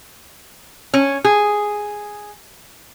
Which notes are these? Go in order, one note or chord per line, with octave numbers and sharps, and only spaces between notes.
C#4
G#4